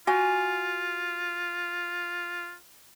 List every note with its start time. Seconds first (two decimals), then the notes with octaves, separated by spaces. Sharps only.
0.07 F4 F#4 G#5